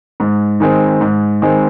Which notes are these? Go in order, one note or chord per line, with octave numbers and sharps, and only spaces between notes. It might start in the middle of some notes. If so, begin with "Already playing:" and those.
G#2
D#3 G#3 C4
G#2
D#3 G#3 C4